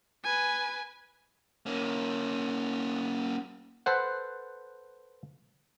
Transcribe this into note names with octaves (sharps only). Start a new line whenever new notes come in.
B4 G#5
A#3 C#4
A4 B4 C5 F#5